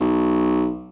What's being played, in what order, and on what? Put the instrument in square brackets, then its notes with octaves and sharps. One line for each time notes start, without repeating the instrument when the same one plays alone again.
[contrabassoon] B1